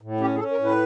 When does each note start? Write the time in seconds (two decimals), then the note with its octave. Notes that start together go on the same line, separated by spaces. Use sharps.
0.01 A2
0.20 C#4 G4
0.35 G#4
0.39 C#4 A4
0.51 A#4
0.58 A2
0.64 B4